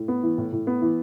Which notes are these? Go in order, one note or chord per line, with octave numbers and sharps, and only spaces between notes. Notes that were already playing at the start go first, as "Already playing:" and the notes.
Already playing: A2
B3
E3
A2
A2
B3
E3